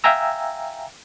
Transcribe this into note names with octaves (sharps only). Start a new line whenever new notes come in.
E5 F5 G5 G#5 A#5 E6